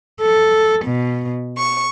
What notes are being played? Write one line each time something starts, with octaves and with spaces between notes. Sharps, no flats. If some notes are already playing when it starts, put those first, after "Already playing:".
A4
B2
C#6